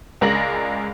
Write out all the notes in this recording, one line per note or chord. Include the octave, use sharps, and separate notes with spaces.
C#2 G#3 A#4 D5 A#6 F#7